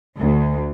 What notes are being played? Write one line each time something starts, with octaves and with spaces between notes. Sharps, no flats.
D2